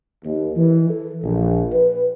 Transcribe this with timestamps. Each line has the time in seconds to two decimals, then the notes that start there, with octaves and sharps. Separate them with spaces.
0.24 D#2
0.56 E3
0.90 A4
1.23 A#1
1.72 B4